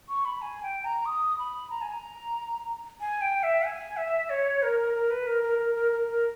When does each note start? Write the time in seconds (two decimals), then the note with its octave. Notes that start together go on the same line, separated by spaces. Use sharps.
0.09 C#6
0.25 B5
0.42 G#5
0.63 G5
0.84 A#5
1.06 D#6
1.39 B5
1.70 A#5
1.82 G#5
1.92 A#5
3.01 G#5
3.21 G5
3.43 E5
3.65 G#5
3.97 E5
4.30 C#5
4.63 A#4
4.94 A#4
5.10 B4
5.27 A#4
5.43 A#4
5.59 A#4
5.75 A#4
5.92 A#4
6.07 A#4